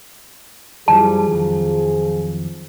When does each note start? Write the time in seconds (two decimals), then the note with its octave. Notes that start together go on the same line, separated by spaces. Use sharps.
0.88 F#2 E3 F3 G3 G#4 A5
1.31 F2 D#3 F#3